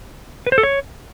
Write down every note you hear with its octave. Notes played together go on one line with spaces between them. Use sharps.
B4
C5
A4
C#5